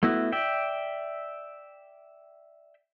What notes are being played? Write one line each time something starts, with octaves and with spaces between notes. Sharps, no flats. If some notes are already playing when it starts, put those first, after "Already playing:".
A3 B3 E4 F#4
D5 E5 G5